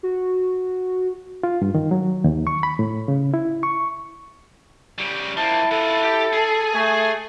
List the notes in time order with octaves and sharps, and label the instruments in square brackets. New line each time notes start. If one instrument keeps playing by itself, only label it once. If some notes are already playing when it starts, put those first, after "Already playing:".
[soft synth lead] F#4
[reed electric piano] F4
G2
D#3
F#3
D#2
C#6
B5
A2
C#3
E4
C#6
[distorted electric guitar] C#3 G3
[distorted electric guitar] F3 A#3 [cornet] E4 [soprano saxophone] A5
[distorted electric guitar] F4 F#5 [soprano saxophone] A4
[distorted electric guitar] G4
G#4
[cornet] A3 [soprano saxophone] G#5